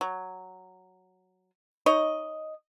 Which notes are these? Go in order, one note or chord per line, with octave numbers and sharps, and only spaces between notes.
F#3
D#4 C#5 D#5